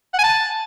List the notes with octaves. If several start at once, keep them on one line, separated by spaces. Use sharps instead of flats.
F#5
G#5
A5